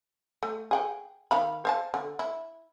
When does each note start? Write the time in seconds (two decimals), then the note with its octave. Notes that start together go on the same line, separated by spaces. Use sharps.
0.43 A3
0.71 G#4 F#5 G5
1.31 D#3 F5 B5
1.65 C5 F5 A5
1.94 D3
2.19 E4